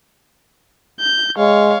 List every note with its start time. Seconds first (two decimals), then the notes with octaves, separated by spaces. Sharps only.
1.00 G6
1.38 G#3 C#5 F5